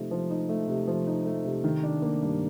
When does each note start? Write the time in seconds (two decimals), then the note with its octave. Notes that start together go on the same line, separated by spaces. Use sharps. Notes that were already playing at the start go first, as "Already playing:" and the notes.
Already playing: C3 F3 A3 D#4
0.11 F3
0.30 D#4
0.49 A3
0.68 C3
0.87 F3
1.07 D#4
1.26 A3
1.44 C3
1.64 D#3
1.83 D4
2.02 A#3
2.22 G2